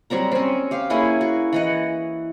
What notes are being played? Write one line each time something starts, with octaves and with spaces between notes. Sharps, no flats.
F#3 G3 C4 A#5
C4 C#4
G4 F5
A#3 C#4 E4 G#4
F#4
E3 D#5 F#5